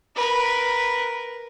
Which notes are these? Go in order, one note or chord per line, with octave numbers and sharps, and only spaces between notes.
A#4 B4